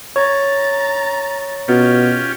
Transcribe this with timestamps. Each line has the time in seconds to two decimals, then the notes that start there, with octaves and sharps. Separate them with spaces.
0.16 C#5 A#5 A6
1.68 B2 C#4 F4 G4